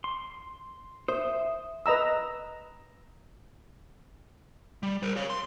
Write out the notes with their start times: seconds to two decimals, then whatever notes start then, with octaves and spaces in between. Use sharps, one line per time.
0.04 C6
1.08 C5 E5 D#6
1.86 B4 D#5 A#5 E6
4.83 G3
5.03 A#4 C5
5.17 C#5 F5
5.30 C6